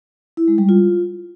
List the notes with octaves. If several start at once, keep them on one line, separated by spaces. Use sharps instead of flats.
E4
G#3
G3
F4